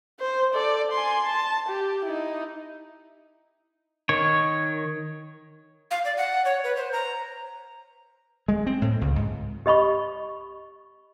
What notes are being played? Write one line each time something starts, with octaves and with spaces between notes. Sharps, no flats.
C5
A4 D5
G#5 C6
A5
G4
D#4 E4
D#3 C#5
F5
D5
F#5
C#5
B4
C5
A#5
G#3
C4
A2
C#2
G#2
G4 D#5 B5 C#6